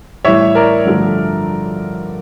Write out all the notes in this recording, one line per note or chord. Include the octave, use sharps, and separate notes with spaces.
A2 E3 G3 C#5 E5
A#4 D5
G2 D3 F3 A3